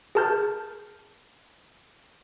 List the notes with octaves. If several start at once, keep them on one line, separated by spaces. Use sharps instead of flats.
G#4 A#4 A5 F6 G6